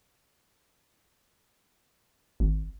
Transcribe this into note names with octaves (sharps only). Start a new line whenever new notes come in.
G#1